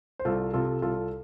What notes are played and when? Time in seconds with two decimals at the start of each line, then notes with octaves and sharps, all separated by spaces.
0.19 C5
0.25 C2 F4 A4
0.53 C3 F4 A4
0.82 C2 F4 A4